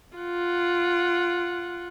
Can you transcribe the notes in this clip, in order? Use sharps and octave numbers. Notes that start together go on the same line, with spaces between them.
F4 F#5